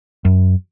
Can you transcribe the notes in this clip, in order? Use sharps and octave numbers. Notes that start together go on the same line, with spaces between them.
F#2